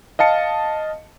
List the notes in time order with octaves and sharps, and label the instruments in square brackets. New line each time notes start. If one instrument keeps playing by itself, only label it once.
[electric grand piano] D#5 F5 A5 C#7